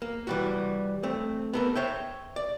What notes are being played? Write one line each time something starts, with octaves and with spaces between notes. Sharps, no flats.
A#3
E3 G3 F#4
A3 C4
B3 A4 A#4
C5 C#5 E5 G5
D5